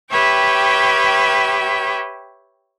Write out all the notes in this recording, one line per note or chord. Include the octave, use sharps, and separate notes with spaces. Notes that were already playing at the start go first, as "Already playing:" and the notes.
G4 B4 C#5 E5 G5